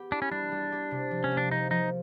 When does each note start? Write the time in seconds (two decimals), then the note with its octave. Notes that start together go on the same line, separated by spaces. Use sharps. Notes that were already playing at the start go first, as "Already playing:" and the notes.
Already playing: B3 G4
0.12 D4 E4
0.22 C#4
0.31 G3 D4
0.52 G3
0.72 G4
0.91 C3
1.11 F3
1.24 C#4
1.31 A#3
1.37 D4
1.51 F3 D#4
1.71 F3 D#4